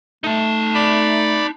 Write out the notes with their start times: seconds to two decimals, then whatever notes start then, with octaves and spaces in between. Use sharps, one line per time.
0.24 A3 D#4 A5
0.74 D5 B5